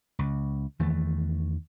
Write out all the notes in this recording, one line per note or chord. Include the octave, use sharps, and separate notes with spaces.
C#2
E2 D#3 E3 A3